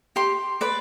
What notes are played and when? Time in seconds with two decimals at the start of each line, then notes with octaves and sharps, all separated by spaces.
0.16 G4 C6
0.61 B4 D5